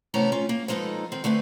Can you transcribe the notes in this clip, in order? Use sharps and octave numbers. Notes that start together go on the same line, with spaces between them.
C3 E3 A3 B3 C#4 A#5
C#4 F4
A#3
F3 G#3 D#4 A4 B4
D#3 C4
D3 A3 C4 B4